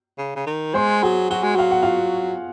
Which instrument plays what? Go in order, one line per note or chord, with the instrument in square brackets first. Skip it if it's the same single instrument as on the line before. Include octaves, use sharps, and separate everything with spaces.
[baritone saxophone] C#3
C#3
D#3
[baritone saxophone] G#3 [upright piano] C5 C6
[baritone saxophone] F#3 [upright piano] G#4 G#5
[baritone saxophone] F#3 [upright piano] F#4 F#5
[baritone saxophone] G#3
[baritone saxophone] F#3 [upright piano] F5
[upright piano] F#5
F4 F5